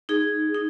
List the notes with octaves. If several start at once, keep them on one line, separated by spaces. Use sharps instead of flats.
D#4 G#4
D#4